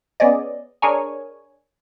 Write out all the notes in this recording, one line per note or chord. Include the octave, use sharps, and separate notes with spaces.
B3 C#4 G#4 D5 D#5
D4 G#4 A#4 C#5 G#5